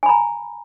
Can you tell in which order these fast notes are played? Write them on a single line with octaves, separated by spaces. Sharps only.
G#5 B5 A#5